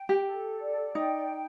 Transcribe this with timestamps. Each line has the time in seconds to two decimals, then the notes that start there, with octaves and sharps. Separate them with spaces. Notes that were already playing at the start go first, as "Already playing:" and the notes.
Already playing: G5
0.09 G4
0.27 A4
0.61 D5
0.95 D#4 G5